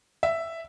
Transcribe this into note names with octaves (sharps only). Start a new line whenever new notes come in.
E5